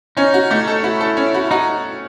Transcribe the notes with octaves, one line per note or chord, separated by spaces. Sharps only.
C#4 D#4
F#4
A3
A4
E4 F#4
A4
C#4
F#4
D#4 F#4